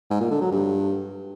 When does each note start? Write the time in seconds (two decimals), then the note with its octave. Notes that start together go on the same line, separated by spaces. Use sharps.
0.10 G#2
0.21 A#2
0.31 D3
0.41 F#3
0.51 G2